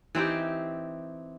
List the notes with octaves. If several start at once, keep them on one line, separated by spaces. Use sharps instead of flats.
E3 C4 D#4 G4